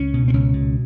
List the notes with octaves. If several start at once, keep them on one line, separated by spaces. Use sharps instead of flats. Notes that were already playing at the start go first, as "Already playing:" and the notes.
Already playing: C#2 C#4
B2
C4
C#2 C#4
B2